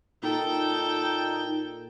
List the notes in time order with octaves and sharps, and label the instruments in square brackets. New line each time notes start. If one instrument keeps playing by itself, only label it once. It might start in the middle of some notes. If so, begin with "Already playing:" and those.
[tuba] A#2 [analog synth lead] D#4 [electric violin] A4 G5